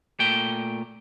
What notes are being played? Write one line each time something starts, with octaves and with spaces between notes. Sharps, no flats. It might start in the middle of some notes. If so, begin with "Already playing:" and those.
A#2 A3 G5